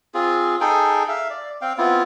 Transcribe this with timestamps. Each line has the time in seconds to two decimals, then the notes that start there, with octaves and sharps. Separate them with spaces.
0.14 C4 F4 G#4
0.61 D#4 G#4 A4 G5
1.09 E5 F5
1.30 D5
1.62 C4 F5 G5
1.78 B3 C4 E4 F4